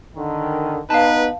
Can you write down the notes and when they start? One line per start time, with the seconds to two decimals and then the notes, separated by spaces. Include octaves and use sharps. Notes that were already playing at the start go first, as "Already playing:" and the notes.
0.16 D3 D#3
0.90 B3 D#4 B4 F5 A5